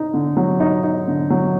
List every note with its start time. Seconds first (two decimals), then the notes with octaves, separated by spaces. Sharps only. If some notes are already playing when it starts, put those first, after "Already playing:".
Already playing: D#4
0.14 D3
0.37 F#3
0.60 D#4
0.83 D#4
1.08 D3
1.30 F#3